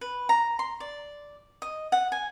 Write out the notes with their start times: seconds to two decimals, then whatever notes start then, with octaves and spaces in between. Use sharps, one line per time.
0.01 B4
0.29 A#5
0.59 C6
0.80 D5
1.62 D#5
1.92 F#5
2.12 G#5